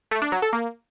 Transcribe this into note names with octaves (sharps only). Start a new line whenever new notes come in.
A3
D4
F#3
A4
A#3